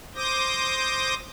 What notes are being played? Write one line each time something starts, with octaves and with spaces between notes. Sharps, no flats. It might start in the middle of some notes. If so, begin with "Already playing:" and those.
C5 D6 D#6 G6 A#6